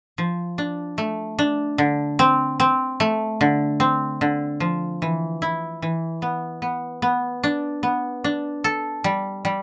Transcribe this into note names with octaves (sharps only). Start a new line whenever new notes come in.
F3
D4
A3
D4
D3
C4
C4
A3
D3
C4
D3
F3
E3
E4
E3
B3
B3
B3
D4
B3
D4
A4
G3
G3